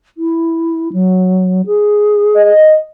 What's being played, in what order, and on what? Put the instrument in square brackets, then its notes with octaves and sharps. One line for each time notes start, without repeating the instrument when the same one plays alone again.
[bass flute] E4
F#3
G#4
[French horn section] D#5